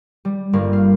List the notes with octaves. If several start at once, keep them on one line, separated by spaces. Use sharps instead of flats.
G3
G1 G2 A#3 A#4
F5